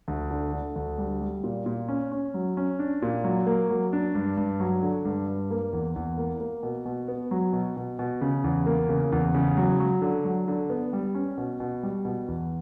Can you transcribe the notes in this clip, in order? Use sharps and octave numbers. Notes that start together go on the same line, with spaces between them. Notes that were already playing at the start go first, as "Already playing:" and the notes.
D2
D3
D3
D2
G3
G3
A#2
A#2
C#4
C#4
F#3
C#4
D4
A#2
F#3
A#3
F#3
D4
G2
G2
F#3
D3
G2
G2
A#3
E2
E2
A#3
A#3
B2
B2
B3
F#3
B2
B2
B2
C#3
E2
A#3
C#3
E2
C#3
F#3
F#3
D3
F#3
D3
B3
G3
C#4
B2
B2
G3
B2
E2